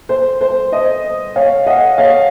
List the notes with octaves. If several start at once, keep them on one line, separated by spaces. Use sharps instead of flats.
C5
C5
C5 D#5
C#5 F5
D#5 F#5
C#5 F5